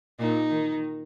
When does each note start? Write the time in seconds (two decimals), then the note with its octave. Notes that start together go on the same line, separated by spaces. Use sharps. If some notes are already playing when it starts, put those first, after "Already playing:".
0.19 A#2 D#4
0.50 D#3